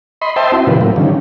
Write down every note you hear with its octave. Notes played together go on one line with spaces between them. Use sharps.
D#5 B5 C6
C5 D#5 E5 G5 A5 C6
C4 E4 F#4
A#2 C#3 E3 F3 G4 B4
A2 F#3 A#3
D3 D#3 F3 G3 C#4